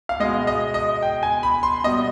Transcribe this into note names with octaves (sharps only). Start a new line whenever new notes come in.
F5
B2 G#3 D#5
D#5
D#5
G5
G#5
B5
C6
B2 G3 D#5